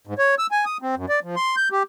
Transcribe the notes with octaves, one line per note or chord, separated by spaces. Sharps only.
G#2
C#5
E6
G#5
D#6
C4
F#2
D5
F3
C6
G6
G4